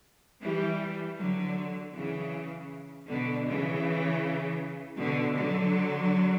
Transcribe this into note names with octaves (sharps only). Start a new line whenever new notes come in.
E3 G3
D3 F#3
C#3 E3
B2 D3
C#3 E3
B2 D3
D3 F#3